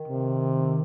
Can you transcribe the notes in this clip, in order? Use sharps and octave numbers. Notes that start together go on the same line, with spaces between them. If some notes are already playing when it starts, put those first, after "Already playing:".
Already playing: D#3
C3